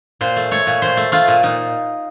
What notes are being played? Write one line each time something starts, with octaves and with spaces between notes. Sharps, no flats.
A#2 C5
A3
A3 C#5
A#2
A#2 C5
A3
A3 F4
A#2
A#2 D#4